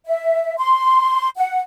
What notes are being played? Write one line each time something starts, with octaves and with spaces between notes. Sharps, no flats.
E5
C6
F#5